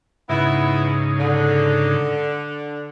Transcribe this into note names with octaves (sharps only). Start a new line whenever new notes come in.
G#2 C#3 B3 D#4 E4
D3